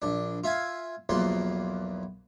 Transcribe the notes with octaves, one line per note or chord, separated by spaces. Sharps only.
A#1 D4
F4 E5 F5 G#5
B1 E2 F3 A#3 C6